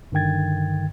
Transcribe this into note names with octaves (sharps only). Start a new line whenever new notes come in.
G2 D3 D#3 G5 G#6 A6